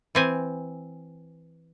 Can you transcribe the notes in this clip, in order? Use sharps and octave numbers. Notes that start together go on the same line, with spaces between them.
E3 C4 G#5